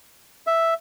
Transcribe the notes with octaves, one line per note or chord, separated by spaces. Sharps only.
E5